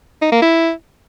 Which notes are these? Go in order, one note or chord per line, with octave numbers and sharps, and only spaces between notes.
D#4
A#3
E4